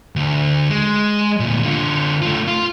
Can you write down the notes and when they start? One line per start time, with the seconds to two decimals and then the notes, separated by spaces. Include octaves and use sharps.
0.16 D2
0.70 G#3
1.40 D2 A#2
1.64 D3 F4
2.22 A3 F4
2.48 F4